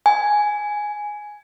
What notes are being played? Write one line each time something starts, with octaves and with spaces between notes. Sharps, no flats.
G#5